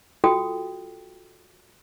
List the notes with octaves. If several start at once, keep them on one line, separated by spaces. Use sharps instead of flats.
F4 F#4 A4 G5 D#6